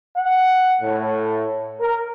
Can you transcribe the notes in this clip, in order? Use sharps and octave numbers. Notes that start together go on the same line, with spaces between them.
F#5
A2
A#4